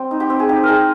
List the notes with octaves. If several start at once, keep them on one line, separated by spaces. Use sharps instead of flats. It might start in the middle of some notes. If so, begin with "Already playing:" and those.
Already playing: G3 C4 C5
D#4
G4
C4
G#4
D#4 G4
D#4 G#4 A#4